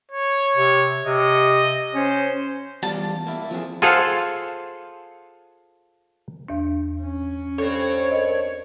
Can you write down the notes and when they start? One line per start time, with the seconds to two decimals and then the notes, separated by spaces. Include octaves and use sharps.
0.11 C#5
0.57 C3
1.05 C3 D#5
1.94 C#4 C5
2.83 E2 G3 F4 A5
3.27 A#3 E4
3.51 F3 C4 G#4
3.82 F4 G#4 A4 C5 F5 F#5
6.48 E2 D4
7.01 C#4
7.58 G2 C4 A4 C#5
8.11 A#4 D#5